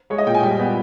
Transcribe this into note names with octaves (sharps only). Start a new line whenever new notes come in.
G#3 C#5
D#5
A#2 G5
G#5
G3 G5
B3